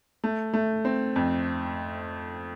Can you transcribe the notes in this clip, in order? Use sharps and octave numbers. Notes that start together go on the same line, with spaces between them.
A3
A3
C4
F2